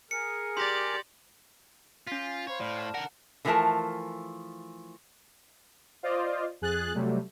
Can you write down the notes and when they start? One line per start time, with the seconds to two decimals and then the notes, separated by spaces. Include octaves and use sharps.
0.11 G#4 A#4 C#7
0.57 G4 D5 C6 A#6
2.07 C#4 F4 F6 B6
2.47 C5 C#5 F5 B5
2.60 A2 D5 F6
2.79 A5
2.94 D3 A#4 F#5
3.45 D3 E3 F3 A3 A#4 A5
6.03 F4 C5 D5 D#5
6.61 F2 G#4 F#6 A6
6.94 C3 F#3 G3 A3